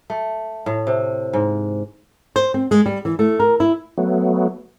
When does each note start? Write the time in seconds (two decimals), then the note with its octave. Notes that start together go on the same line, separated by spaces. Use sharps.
0.10 A3
0.66 A2
0.87 C3
1.33 G#2
2.36 C5
2.54 C4
2.71 G#3
2.86 G3
3.05 E3
3.19 A3
3.40 A#4
3.60 E4
3.98 F#3 A3 B3